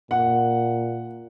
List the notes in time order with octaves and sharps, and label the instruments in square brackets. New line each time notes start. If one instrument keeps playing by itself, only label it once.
[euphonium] A#2 [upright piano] F#5